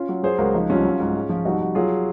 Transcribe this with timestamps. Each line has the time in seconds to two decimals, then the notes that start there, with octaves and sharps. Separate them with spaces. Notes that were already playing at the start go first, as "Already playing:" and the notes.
Already playing: C#4 F4
0.09 F#3
0.23 F#3 G#4 C5
0.38 C#2 F#4 A#4
0.54 F3 D#4
0.69 C2 C#4 F4
0.85 F#3
0.99 G#2
1.15 G#3
1.29 F3
1.45 C2 D#4 F#4
1.60 C2
1.75 F#3 F4 G#4